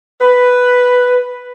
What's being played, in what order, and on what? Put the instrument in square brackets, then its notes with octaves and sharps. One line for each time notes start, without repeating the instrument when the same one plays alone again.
[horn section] B4